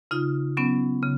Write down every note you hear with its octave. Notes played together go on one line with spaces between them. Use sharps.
C#3 D#4 F4
F#3 B3 C#4
C#3